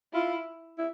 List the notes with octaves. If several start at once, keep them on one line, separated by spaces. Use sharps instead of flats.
E4 F4
E4